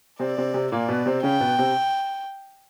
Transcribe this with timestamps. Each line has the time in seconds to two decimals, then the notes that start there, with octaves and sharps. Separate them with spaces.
0.19 C3 C4 D5
0.38 C3 C4
0.54 C3 C4
0.72 A#2 A#3 D5
0.88 B2 B3
1.06 C3 C4
1.23 C#3 C#4 G5
1.40 B2 B3
1.59 C3 C4